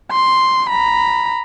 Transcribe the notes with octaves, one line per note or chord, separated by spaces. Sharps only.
C6
A#5 B5